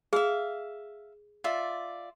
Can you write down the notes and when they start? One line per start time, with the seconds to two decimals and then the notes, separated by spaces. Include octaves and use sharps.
0.13 G#4 E5 F5
1.44 F4 D5 E5